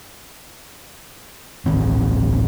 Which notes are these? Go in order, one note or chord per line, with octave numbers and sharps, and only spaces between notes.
D1 A1 D#3 C4